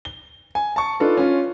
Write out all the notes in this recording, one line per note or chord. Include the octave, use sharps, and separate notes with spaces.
G7
G#5
A5 C#6
D4 D#4 F4 A4 B4
C#4 F4